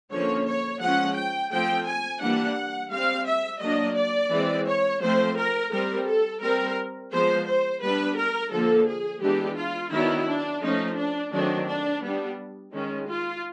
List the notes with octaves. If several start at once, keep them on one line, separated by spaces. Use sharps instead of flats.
D3 F3 A#3 C#4 C#5
C#5
F3 G#3 C#4 F#5
G5
F3 A3 C4 G5
G#5
E3 G3 A#3 D4 F#5
G3 C4 F5
E5
F#3 A#3 D4 D#5
D5
E3 G#3 C4
C#5
F3 A3 C4 C5
A#4
G3 C4 A#4
A4
G3 C4 A#4
F3 G#3 B3 C5
C5
G3 B3 D4 B4
A#4
D3 F3 A#3 A4
G#4
E3 G#3 B3 D4 G4
F4
D#3 F#3 B3 D4 E4
D4
F3 A3 C#4 D#4
D4
D#3 F#3 A3 C4 D4
D4
G3 B3 D4
D#3 G#3 C#4
F4